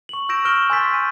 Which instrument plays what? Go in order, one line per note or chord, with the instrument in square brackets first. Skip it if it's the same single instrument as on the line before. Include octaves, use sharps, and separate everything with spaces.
[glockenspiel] C#6 F#7
C#6 E6 G6 A#6 D7 E7
C#6 F6 G6 D7 E7 G7
G#5 C6 E6 G6 A6 B6
D#7